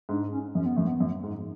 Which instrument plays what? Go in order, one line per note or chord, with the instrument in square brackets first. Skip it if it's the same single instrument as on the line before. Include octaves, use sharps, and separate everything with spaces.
[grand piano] G#2 [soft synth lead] D4
[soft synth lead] C#4
[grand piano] F#2 [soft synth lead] C#4
[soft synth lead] B3
[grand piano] F#2 [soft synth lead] A3
[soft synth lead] B3
[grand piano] F#2
G#2